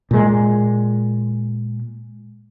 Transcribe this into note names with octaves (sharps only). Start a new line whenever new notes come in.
A#2 G#3